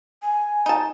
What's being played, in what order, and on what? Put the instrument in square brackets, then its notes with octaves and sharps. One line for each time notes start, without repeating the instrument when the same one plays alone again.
[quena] G#5
[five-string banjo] D#4 A5